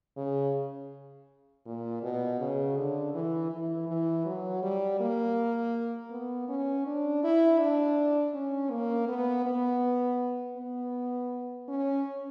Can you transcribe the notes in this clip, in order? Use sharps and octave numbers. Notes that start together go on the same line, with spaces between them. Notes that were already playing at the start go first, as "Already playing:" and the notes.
C#3
A#2
B2
C#3
D3
E3
E3
E3
F#3
G3
A#3
B3
C#4
D4
E4
D4
C#4
A#3
B3
B3
B3
C#4